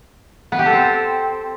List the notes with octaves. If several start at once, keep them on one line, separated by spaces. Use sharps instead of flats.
B3
G4
A4
C4